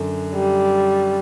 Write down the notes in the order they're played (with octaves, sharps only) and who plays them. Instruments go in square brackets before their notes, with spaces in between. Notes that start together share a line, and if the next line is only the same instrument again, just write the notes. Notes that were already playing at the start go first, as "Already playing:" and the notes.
Already playing: [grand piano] F#2 D3
[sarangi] G3